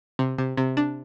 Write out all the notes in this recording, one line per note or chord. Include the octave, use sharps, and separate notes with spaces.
C3
C3
C3
D4